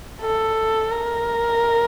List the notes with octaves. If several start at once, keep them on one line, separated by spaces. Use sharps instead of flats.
A4
A#4